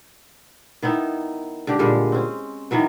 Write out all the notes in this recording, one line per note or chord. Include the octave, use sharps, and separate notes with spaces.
D#3 B3 D#4 E4
D3 G4
A#2 D3 G3 G#3
C4 C#4
D#3 E3 F#3 B3